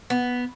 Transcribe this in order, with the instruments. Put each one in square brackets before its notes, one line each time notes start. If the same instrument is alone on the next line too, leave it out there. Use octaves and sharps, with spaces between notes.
[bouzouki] B3